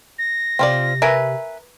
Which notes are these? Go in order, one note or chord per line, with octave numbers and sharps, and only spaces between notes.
A#6
C3 C4 F4 D5
A#4 B4 E5 G#5